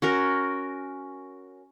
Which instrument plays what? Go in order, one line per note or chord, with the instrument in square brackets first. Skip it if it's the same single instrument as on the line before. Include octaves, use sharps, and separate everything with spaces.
[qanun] C#4 F#4 A#4